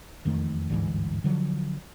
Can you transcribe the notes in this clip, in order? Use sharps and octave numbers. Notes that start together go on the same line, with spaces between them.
E1 F2 D#3 A3
G1 D2 G#2 E3
D3 F3 F#3